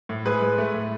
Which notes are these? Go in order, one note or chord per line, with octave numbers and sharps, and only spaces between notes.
A2
G#3 G#4 B4
G#3
A3
A2